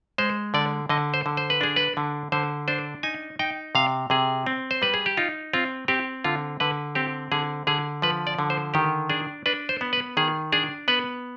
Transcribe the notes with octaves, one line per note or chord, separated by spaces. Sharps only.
G#3 C5
D3 D5
D3 D#5
C5
D3
C5
B4
D4 G#4
B4
D3
D3 C5
D4 C5
D#4 G#5
D#4 G5
C3 F5
C3 G#4
C4
C5
G3 B4
G#4
G4
D#4 F4
C4 F4
C4 G4
D3 F4
D3 B4
C4 G4
D3 G#4
D3 G#4
F3 B4
D5
D3
C5
D#3 G4
D4 G#4
D4 B4
C5
B3
B4
D#3 G#4
D4 G#4
B3 B4